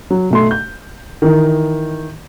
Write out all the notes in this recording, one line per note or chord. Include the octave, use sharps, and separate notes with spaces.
F#3
B1 A3 C6
G6
D#3 E3